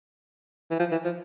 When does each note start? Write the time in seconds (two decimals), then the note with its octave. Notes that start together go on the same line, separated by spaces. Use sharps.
0.71 E3
0.80 F3
0.92 E3
1.05 F3